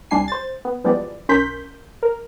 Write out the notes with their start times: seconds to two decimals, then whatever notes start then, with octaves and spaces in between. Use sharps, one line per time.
0.11 C2 G3 D4 G#5 C7
0.28 C5 A6
0.65 B3
0.84 E3 F3 G3 G#3 B3 D5
1.29 B1 C#4 A#4 C6 G6 B6
2.03 A#4